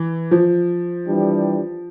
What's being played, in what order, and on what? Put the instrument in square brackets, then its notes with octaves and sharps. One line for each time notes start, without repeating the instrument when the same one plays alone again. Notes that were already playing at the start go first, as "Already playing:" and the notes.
Already playing: [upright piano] E3
F3
[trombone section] E3 G3 D4 G4